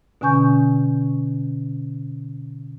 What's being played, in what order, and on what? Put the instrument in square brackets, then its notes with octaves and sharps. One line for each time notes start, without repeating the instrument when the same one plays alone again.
[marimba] B2 D3 C#4 G#5 C#6 G6